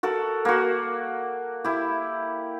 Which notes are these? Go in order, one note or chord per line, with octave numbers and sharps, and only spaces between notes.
F#4 A4 A#4
A#3 F#4
E4 G4